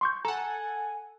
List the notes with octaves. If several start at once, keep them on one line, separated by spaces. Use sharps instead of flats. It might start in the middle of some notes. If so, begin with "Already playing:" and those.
C6 C#6 G6
A4 F#5 G#5 A#5